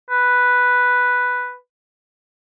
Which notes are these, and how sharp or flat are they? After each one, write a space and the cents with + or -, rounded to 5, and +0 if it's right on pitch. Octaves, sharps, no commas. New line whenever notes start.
B4 +0